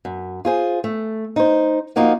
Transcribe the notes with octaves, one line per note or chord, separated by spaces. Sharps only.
F#2
F4 G#4 C5
A3
D#4 C5
F3 A#3 D#4 F4 F#4